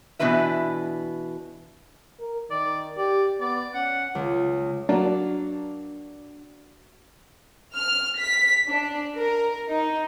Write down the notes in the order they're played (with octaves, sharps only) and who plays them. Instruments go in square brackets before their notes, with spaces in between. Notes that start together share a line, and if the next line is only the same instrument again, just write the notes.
[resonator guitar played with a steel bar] B2 E3 D4 B4 E5
[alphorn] A#4
[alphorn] D#3 [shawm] D5
[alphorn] G4 [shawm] D5
[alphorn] B3 [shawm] D5
[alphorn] C#4 [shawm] F#5
[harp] C#2
[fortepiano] F#3 A#3 [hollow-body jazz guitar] D4
[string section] F6
B6
D4
A#4
D#4